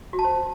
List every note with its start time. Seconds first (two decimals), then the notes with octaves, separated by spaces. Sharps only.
0.13 F#4
0.19 A5
0.24 C5